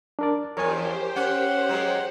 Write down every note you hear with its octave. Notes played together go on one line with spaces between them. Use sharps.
D4 A#4 D5
E2 F3 G4 A#4 C5 C#5 G#5
C#4 F#5
F#3 G#3